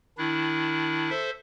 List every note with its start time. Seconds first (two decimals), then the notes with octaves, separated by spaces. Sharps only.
0.18 D#3 D4 E4
1.10 A4 C5 E5